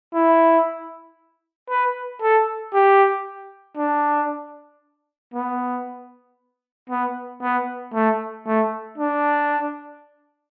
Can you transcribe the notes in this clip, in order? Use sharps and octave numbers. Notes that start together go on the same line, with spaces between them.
E4
B4
A4
G4
D4
B3
B3
B3
A3
A3
D4